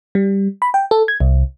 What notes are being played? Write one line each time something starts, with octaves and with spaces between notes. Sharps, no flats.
G3
B5
G5
A4
G#6
C2